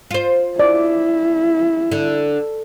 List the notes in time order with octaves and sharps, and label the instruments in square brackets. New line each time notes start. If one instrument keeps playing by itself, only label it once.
[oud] F4 C5
[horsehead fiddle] E4 [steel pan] D5
[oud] D3